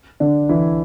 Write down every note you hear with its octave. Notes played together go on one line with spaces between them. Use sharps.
D3 D4
E3 E4